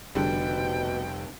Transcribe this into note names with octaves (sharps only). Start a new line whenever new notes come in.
F1 B2 D3 G3 G5